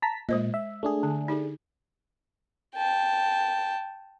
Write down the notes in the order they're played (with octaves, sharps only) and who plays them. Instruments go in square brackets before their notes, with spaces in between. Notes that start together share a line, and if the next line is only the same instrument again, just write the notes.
[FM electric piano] A5 A#5 B6
[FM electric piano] A#2 [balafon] G#3 C5 D#5
[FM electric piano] E5
A3 D4 G#4
[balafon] D3
D#4 G4
[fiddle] G5 A5